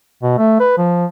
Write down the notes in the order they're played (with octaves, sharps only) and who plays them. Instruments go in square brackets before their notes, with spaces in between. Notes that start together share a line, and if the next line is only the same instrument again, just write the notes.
[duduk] B2
A3
B4
F3